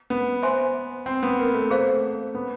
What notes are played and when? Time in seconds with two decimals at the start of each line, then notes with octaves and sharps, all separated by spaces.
0.10 B3
0.43 C5 E5 G#5 C6
1.06 C4
1.23 B3
1.39 A#3
1.54 A3
1.70 G#4 C5 F5 A#5
2.35 B3